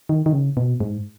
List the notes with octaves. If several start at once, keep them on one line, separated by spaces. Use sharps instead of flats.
D#3
D#3
C#3
B2
G#2